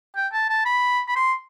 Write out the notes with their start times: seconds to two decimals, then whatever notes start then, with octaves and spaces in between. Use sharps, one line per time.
0.16 G5
0.33 A5
0.50 A5
0.66 B5
1.08 B5
1.16 C6